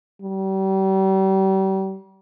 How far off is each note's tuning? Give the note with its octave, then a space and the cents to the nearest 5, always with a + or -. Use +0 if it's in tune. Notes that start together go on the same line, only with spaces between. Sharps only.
G3 -35